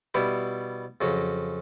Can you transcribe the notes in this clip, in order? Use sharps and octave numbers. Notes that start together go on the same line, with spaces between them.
B2 G3 B3 E4
F2 C#3 F#3